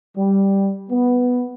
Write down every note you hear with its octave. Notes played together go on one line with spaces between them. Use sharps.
G3
B3